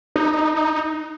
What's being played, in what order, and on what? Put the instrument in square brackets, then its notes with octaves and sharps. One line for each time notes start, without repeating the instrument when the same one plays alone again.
[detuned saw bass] D#4